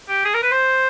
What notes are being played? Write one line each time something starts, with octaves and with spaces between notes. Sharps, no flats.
G4
G#4
A#4
B4
C5